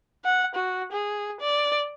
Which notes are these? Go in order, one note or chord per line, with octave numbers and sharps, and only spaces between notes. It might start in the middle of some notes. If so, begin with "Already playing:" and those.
F#5
F#4
G#4
D5